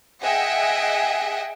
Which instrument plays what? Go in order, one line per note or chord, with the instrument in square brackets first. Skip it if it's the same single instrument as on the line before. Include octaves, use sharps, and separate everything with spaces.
[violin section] G#4 D#5 E5 F#5 G5